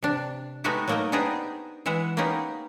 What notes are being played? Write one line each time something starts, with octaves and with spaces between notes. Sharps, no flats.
C3 D4
G#3 A3 B3 D#4 F#4 G4
F#3 A3 A#3 D#4 A#4 D#5
B3 D4 D#4 G4 G#4 C5
E3 G#3 E5 F#5
A#3 B3 C#4 D#4 G4 G#4